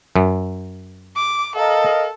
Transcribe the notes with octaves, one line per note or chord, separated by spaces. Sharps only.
F#2
D6
A4 A#4 D#5 F5